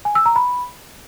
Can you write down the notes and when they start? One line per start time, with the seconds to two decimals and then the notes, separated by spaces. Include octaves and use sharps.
0.05 G#5
0.15 E6
0.26 A#5
0.36 B5